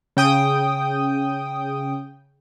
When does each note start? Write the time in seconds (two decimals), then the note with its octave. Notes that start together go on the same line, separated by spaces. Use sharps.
0.17 C#3 G5 D#6